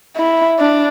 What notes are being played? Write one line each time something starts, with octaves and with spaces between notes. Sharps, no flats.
E4
D4